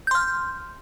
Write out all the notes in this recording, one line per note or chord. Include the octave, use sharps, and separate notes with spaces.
C6 F6 G6